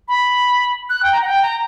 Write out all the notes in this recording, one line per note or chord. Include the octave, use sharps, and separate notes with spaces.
B5
F#6
G5
A#5
F#5
G5
A#5